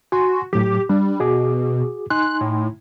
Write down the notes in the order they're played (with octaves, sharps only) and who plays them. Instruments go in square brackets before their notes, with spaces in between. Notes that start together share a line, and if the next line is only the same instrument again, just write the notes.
[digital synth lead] F#4 [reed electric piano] G#5 C6
[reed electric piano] A2 F#3 [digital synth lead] G4
[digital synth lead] G3 [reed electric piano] D4
[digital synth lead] B2 [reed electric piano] F#4 G#4 D6
[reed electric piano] D#4 G#5 C6 [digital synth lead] F#6
[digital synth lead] A2